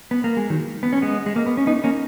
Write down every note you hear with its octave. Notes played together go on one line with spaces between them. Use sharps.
B3
A#3
G#3
D#3 F#3
B3
C#4
G#3 B3
G#3
A#3
B3
C#4
B3 D#4
A#3 C#4